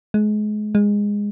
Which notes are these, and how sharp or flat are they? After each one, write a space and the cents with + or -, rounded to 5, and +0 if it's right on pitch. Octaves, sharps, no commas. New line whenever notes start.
G#3 +30
G#3 -15